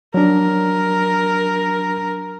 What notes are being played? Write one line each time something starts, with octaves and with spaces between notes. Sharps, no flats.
F#3 D4 A#4